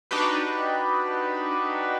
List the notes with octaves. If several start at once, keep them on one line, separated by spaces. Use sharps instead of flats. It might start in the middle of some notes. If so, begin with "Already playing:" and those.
D4 D#4 F#4 G4 B4